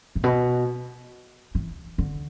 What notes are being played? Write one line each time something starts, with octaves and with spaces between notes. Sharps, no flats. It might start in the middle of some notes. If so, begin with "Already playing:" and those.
A2
B2
E3
D3